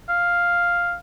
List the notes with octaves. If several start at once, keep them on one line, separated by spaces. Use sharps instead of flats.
F5